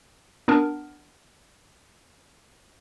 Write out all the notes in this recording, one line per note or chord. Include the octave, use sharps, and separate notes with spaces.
B3 D4 A#4